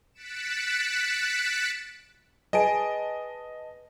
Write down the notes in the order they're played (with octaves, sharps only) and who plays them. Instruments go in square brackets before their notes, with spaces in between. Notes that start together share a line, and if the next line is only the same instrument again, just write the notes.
[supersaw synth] F#6 A6 B6 C#7 D7 E7
[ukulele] G#4 B4 G#5 [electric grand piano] D#5 A5 D7